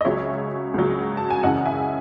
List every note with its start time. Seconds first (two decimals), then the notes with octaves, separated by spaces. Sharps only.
0.01 D#5
0.05 C#2 C#3 F#3 C#5 E5
0.74 C#2 C#3 F#3
1.17 A5
1.30 G#5
1.43 F#2 C#3 E3 D#5 F#5
1.66 E5 G#5